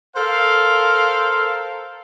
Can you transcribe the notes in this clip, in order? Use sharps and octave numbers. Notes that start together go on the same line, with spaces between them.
A4 A#4 C5 F5